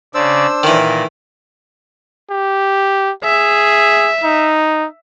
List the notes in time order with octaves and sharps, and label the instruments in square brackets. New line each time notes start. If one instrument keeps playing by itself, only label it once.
[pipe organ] C#3 D5 [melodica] D4 C5 E6
[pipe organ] A#2 [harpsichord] D#3 E3
[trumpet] G4
[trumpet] G#4 [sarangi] E5
[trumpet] D#4